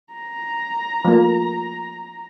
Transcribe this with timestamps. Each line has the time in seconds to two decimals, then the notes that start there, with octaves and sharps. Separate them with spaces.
0.13 A#5
1.05 F3 A3 A#3